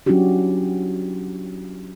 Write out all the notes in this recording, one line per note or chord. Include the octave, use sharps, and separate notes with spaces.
F#3 C#4 D4 E4 F#4 G4